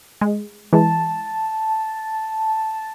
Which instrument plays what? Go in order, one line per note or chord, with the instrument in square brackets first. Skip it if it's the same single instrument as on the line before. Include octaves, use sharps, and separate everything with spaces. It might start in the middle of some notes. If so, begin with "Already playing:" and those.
[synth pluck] G#3
[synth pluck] E3 G#3 [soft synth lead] A5